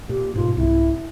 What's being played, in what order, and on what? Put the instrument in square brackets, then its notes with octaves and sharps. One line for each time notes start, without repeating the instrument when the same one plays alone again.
[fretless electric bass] A#2 [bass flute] G4
[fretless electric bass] G#2 B2 [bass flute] F4
[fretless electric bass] C2 G#2 [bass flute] E4